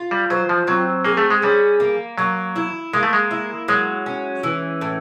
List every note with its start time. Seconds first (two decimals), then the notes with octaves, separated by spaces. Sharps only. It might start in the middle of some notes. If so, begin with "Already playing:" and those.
Already playing: F4
0.11 G3
0.30 F#3 C5
0.49 F3
0.67 F#3 C4
1.05 A#3 G#4
1.17 A3
1.30 G#3
1.42 G3 C#4
1.80 A#3
2.18 F#3 A#3
2.56 E4
2.93 G#3 A#3
3.03 A3
3.13 G#3
3.31 E4
3.68 F#3 G#3
4.06 C#4
4.43 E3
4.81 A2